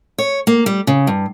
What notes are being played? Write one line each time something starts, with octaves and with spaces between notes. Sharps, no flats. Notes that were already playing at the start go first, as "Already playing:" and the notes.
C#5
A#3
G3
C#3
G2